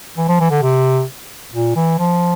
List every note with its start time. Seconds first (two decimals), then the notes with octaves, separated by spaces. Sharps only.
0.18 E3
0.29 F3
0.40 E3
0.51 D3
0.62 C3
1.53 A#2
1.76 E3
1.99 F3